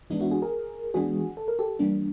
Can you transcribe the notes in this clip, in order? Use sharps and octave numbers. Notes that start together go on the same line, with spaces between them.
E3 G#3 B3 D4 D#4
E4 F#4
F#4 G#4
G#4 A#4
E3 G#3 B3 D4 F#4 G#4
A4
A#4
G4 A4
E3 G3 A#3 D4